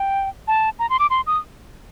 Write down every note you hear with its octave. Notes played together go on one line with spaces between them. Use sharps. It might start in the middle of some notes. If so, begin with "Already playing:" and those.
Already playing: G5
A5
A#5
C6
D6
C6
D#6